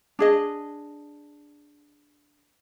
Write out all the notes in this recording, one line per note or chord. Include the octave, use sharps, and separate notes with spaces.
D4 G#4 D#5